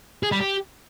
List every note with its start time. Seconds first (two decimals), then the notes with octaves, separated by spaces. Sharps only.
0.23 G#4
0.32 G3
0.41 G4